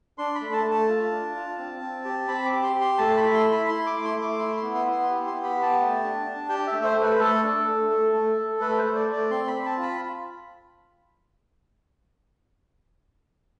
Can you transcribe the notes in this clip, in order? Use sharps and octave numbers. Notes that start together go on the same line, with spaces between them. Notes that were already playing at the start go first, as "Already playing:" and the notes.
D4 C6
B5
A3
A5
A3
A5
F4
D4
F4
C4
C4
G4
C4 B5
D6
G4
C6
G4
C6
A3 A5
B5
E4
C6
E4
B5
E4 C6
D6
A3
C6
A3
D6
E4 C6
C6
B3
C6
E4
C6
G4
C6
B3
B5
G4
A5
A3
D4
D4
G4 G5
E5
A3
C5
A3 B4
A3 A4
D4
A3
A3
A3
A3
A3 B4
A3 C5
D5
A3
D5
C4 C6
B5
C4
A5
F4
B5